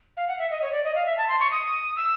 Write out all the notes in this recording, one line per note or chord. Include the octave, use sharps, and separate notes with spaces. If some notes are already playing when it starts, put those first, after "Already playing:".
F5
F#5
E5
D#5
C#5
D5
D#5
F5
E5
A5
C6
C#6
D#6
E6